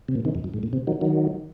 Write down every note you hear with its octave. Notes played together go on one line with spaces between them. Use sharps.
C3
A#2
C3 D#3
F2
F#2
G#2
A#2
C3
D#3 F#3
D#3 F#3